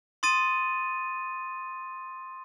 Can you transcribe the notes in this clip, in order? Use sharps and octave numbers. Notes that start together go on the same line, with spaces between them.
C6 D#6 A6 D#7